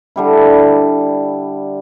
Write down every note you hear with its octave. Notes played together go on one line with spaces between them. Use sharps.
D3 G3 E4